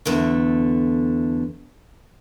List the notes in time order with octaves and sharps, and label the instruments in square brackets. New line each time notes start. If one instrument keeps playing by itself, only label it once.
[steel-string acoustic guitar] E2 D3 A3